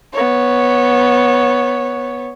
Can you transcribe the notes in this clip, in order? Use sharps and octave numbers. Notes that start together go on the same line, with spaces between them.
B3 C#5